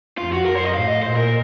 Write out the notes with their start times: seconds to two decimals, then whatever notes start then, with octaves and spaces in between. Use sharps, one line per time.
0.18 F2 F4
0.33 F#4
0.46 F#2 A#4
0.55 C5
0.65 D#5
0.74 A2 F5
0.88 D#5
1.03 A#2 C5
1.17 A#4